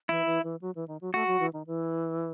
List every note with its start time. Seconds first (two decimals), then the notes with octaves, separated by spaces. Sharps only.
0.09 E3 E4
0.26 E3
0.44 E3
0.61 F#3
0.75 E3
0.88 D#3
1.01 F#3
1.14 A3 F#4
1.27 F#3
1.40 E3
1.53 D#3
1.67 E3